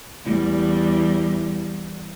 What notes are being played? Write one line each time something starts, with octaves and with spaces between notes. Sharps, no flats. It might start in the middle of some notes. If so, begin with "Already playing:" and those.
E2 G3